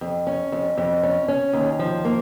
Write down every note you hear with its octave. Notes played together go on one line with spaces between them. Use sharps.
F2
C#4
F2
F2
C#4
C#4
D#2
F3
A#3